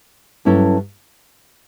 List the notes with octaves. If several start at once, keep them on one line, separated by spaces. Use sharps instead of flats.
G2 F#3 C#4 E4 A4